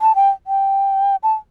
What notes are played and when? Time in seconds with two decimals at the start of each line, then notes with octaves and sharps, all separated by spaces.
0.01 A5
0.15 G5
0.47 G5
1.23 A5